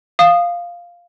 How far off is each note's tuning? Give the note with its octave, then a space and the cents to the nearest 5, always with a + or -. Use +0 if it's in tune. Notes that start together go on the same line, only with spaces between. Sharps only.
F5 +0 D#6 -15